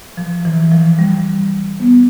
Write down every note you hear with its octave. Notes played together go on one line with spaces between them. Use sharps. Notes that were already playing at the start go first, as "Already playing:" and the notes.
F3
E3
F3
G3
B3